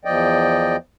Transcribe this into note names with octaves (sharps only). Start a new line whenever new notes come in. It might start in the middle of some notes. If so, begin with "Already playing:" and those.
E2 F3 D5 D#5 G5